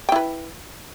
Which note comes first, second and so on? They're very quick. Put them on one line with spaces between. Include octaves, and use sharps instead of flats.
G5 E4 B4